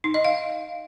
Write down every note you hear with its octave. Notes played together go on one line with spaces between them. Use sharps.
D#4
D#5
F5